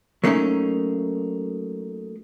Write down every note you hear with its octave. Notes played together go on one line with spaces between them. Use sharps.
F#3 A3 A#3 C#4 D#4